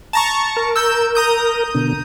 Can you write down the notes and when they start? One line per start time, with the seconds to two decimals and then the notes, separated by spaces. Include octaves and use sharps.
0.13 A5 A#5 C#6
0.57 A#4
0.76 E6 G6
1.15 A#5 D#6 G6
1.74 B2 D3